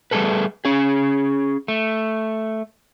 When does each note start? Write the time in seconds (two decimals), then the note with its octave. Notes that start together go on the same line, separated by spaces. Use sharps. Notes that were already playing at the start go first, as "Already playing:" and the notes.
0.11 G3 A3 G#4 A4 B4
0.65 C#4 G#4
1.68 A3